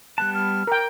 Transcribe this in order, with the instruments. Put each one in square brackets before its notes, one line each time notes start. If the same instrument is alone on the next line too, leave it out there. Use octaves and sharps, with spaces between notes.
[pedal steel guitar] G3 B3 A5 [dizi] F#6
[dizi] F6
[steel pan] A#4 G5